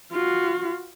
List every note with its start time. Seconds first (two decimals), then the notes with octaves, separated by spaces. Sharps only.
0.12 F4 F#4